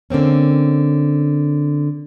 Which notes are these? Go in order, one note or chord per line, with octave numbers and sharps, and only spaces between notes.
D3 A#3 C4 C#4